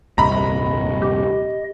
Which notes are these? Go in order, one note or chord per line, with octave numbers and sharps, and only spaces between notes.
D#1 C2 G2 C3 D#5 A#5 B5
G4